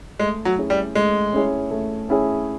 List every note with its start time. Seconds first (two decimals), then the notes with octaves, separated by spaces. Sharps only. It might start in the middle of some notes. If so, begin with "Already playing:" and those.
0.19 G#3 A3
0.45 F#3
0.58 C#4 E4 G#4 C#5
0.70 G3
0.95 G#3 A3
1.33 C#4 E4 G#4 C#5
1.71 A3
2.09 C#4 E4 G#4 C#5